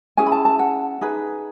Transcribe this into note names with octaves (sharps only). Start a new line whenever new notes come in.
C#4 E4 G#4 G#5
B5
A5
A5
F#5
D#4 G#4 B4